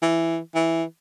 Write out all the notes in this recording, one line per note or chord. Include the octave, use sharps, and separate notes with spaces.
E3
E3